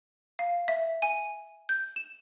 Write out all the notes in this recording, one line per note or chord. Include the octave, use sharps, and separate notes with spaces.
F5
E5
G#5
G6
E7